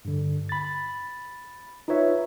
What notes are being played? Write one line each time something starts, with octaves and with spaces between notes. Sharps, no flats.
G2 D3
B5 A6
D#4 F4 B4 C#5 E5